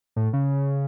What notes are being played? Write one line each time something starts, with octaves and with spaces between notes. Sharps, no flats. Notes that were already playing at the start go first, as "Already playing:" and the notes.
A2
C#3